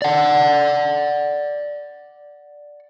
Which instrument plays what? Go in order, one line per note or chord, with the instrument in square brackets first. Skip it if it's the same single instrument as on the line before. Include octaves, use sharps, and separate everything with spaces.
[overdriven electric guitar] D5 F#5